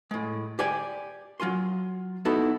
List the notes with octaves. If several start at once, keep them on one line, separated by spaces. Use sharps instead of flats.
A2 G#3
G4 D5 G#5
F#3 F4 G#5 C6
B3 D#4 E4 F#4 A4